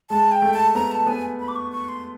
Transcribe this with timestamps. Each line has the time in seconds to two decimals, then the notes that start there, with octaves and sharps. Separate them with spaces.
0.10 G#3 A5
0.31 G5
0.42 A3
0.54 A5
0.74 B3 A#5
0.91 A5
1.07 B3 G#5
1.40 B5
1.48 D6
1.55 C#6
1.72 C#6
1.88 C6